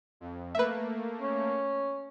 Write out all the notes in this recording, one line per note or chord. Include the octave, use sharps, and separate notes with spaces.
F2
A3 A#3 B4 E5
C#4